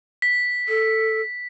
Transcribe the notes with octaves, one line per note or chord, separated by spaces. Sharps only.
B6
A4